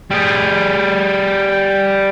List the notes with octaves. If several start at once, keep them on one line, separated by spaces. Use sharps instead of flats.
G3 G#4